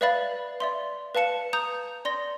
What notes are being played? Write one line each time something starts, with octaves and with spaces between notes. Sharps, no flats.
B4 D5 E5 F5 B5 A6
D5 E5 C6
B4 F5 A5 C#7 E7
A#5 D#6 G6 F7
D5 C6 A#6